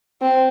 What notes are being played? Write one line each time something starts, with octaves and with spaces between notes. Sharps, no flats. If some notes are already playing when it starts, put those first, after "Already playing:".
C4